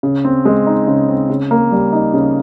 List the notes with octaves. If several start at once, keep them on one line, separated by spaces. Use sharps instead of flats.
C#3
C4
G#3
D#4
C#3
C4
C#3
A#3
G3
D#4
C#3